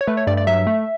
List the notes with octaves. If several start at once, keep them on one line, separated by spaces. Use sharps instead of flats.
C#5
A3 B4
C#5
G2 D5
D5
F#3 E5
A3